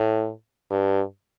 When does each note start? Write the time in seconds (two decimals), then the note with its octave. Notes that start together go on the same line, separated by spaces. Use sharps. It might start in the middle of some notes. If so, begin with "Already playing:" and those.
Already playing: A2
0.71 G2